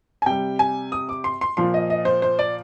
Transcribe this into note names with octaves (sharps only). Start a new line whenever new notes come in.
G#5
C3 G3 G5
G#5
D#6
D6
C6
C6
A#2 F3 C6
D#5
D#5
C5
C5
D5